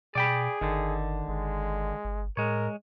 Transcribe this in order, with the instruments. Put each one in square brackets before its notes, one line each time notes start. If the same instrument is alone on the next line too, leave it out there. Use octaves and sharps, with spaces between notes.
[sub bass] B2 [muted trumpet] G#4 [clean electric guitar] D5 G5 B5
[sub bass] G1 [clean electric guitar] D3 D#3
[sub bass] G1 [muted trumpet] G#3
[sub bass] G1
[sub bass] A2 [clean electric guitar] G#3 C#5 [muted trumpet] A#4